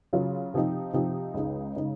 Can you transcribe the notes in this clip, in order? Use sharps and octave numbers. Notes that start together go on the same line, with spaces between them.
C#3 F#3 C#4 F4
C3 F3 C4 D#4
C3 F3 C4 D#4
C#2 C#3 G#3 D#4
C#3 G#3 D#4